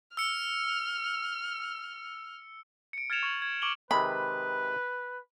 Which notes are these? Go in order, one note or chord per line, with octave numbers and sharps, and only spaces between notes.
E6 F6 C#7
C#7 D7
F6 G#6 A6 C#7 E7 F7
C#6 G#6 F#7
G#6
C#6 D6 D7 E7 F#7 G7
C3 D#3 G#3 B4 B5